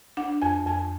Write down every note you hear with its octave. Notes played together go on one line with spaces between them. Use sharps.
D4 F#5
F2 G#5
F2 G#5